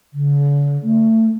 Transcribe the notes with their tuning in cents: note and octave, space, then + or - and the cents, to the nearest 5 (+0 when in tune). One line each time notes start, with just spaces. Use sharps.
D3 -45
A3 +25